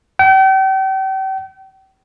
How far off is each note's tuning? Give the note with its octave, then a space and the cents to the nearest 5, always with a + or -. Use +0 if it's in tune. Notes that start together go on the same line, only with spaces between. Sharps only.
G5 -40